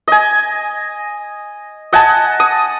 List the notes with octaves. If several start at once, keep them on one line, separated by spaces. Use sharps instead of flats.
D#5 G#5
D#5 F#5 G#5 A5
D#6